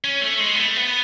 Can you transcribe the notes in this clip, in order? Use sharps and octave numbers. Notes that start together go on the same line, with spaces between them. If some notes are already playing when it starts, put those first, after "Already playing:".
C#4
A3
G#3
B3
A3
B3